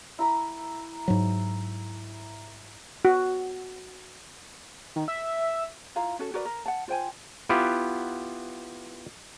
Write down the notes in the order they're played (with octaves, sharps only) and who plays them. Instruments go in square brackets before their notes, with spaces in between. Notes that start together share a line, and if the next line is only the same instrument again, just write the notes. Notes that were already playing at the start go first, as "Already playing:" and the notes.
[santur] E4 A#5 B5
[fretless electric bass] G#2 F#3
[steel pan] F#4
[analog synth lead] D#3
E5
[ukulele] E4 F4 F5 A#5
C#4 F#4 A4
F#4 A#4 B4 D5
A#4
F#5 A5
F4 C5 G5 G#5
[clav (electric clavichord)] B3 E4 F4 G4 B4